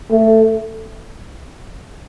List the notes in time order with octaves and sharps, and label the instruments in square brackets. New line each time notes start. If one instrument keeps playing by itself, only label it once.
[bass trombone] A3